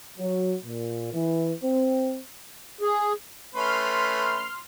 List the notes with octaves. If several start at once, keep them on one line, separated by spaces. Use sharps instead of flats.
F#3
A#2
E3
C4
G#4
A3 C#4 B4 C6 F6